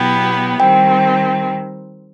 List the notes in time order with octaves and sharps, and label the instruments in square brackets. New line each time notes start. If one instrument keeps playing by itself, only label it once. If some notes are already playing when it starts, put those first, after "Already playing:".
Already playing: [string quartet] B2 F#3 B3 E4 G4 [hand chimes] G5
[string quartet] D#3 G3 C4 [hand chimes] G5